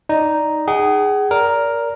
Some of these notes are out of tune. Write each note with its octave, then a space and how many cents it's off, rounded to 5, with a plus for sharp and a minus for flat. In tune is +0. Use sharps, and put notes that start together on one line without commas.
D#4 +0 D5 +0
G#4 -5 F#5 +40
A#4 +5 D5 -25